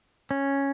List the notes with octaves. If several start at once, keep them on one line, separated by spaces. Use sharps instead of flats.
C#4